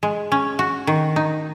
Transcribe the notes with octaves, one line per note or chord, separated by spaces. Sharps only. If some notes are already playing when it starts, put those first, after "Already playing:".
G#3
C#4
F#4
D#3
D#4